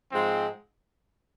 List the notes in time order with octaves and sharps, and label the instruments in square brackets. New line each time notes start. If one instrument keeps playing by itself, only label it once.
[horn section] G#2 F3 G#3 C4